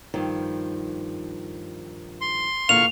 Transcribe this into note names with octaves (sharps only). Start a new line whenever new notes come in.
G2 D#3 F3
C6
E2 A#2 D3 F5 C#6 F7